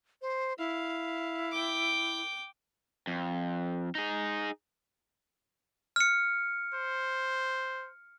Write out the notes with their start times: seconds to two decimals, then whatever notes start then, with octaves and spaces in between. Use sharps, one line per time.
0.22 C5
0.58 E4 F5
1.51 G5 D6
3.07 F2
3.95 D#4 G#4
5.96 F6 C#7
6.74 C5